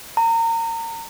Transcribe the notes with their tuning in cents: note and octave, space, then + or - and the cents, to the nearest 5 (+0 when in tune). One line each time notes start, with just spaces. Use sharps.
A#5 -30